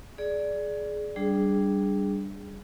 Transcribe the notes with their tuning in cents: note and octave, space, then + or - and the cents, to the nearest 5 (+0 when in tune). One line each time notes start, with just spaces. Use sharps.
G#4 +20 D5 +0
G3 +0 D4 +0 G#4 -5